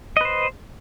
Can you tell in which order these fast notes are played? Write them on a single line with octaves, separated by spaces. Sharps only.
D#5 B4 C5